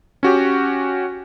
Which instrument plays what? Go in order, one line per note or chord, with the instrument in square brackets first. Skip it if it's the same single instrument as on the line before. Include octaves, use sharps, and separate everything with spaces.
[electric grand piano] C#4 F#4 G4